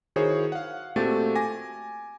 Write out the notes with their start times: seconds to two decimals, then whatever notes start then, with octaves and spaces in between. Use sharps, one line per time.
0.16 D#3 E4 F#4 G#4 C5 C#5
0.52 F5 F#5
0.96 A#2 A3 C4 F#4 G4 A6
1.36 G#5 D6 A#6